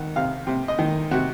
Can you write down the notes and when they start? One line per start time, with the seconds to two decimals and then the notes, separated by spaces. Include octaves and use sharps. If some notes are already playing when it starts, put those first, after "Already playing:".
Already playing: D#3 F#5
0.16 C3 F5
0.47 C3
0.68 D#5
0.79 D#3
1.11 C3 F#4